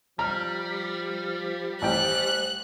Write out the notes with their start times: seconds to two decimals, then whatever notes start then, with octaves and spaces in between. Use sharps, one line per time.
0.19 F3 G3 A#5 F6
1.82 A1 C5 G5 F#6